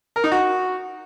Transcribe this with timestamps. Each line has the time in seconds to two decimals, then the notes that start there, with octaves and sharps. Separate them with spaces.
0.16 A#4
0.24 D#4
0.32 F#4